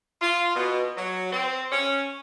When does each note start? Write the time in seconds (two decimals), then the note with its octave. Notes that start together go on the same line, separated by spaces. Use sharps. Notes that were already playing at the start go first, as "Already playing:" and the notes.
0.22 F4
0.56 B2
0.97 F#3
1.32 C4
1.72 C#4